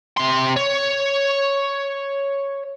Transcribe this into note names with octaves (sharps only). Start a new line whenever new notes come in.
C3 C6
C#5